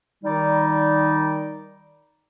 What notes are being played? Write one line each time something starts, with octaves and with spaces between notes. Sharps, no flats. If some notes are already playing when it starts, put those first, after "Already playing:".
D#3 G3 D#4 D5